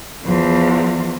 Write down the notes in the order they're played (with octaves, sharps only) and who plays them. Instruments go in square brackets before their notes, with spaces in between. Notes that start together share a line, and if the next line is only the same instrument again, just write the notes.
[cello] E2 F3